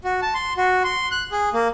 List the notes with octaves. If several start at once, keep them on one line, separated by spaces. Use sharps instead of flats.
F#4
A5
C6
F#4
C6
F#6
G#4
A#3